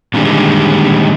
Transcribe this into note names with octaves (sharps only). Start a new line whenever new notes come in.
A#2 D3 D#3 G3 G#3